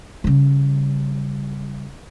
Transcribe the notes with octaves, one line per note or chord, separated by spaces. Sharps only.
C#3 G3